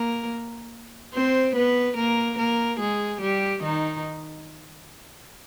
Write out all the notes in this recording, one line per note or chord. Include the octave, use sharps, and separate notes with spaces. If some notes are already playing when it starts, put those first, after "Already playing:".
Already playing: A#3 A#4
C4 C5
B3 B4
A#3 A#4
A#3 A#4
G#3 G#4
G3 G4
D#3 D#4